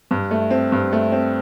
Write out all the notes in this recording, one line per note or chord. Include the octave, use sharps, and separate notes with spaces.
G2
A3
C4
G2
A3
C4